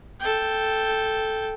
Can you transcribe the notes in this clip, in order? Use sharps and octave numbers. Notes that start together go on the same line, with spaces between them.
A4 G5